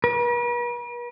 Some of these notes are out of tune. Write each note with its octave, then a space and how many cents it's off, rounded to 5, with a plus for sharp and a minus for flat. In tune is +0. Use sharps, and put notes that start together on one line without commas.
B4 -45